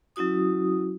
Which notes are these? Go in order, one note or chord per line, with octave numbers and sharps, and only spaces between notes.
F#3 C#4 E4 F#4 D#6